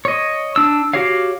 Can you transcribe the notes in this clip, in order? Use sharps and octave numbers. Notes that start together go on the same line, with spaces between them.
C#5 D#5
D4 E6
F#4 G4 C#5 F5